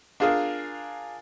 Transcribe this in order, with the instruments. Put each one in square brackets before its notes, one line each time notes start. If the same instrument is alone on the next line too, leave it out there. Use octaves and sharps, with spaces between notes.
[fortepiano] D4 F4 G#4 A#4 F5